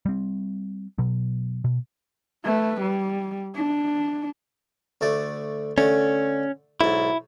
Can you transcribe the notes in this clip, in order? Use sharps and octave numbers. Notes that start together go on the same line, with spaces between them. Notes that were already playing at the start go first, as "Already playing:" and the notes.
G3 C4
B2 F#3
B2
A3 B4
G3
D4
D2 A3 D5
D3 A3 C#4
B1 G#2 E4